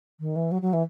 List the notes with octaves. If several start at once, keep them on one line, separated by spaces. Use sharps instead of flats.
D#3
E3
F#3
F#3
E3